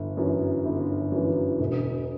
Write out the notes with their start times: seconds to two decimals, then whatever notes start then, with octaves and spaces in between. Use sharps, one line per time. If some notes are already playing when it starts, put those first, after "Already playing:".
Already playing: G1
0.17 F#2 E3
0.65 G1
1.12 F#2 E3
1.60 E1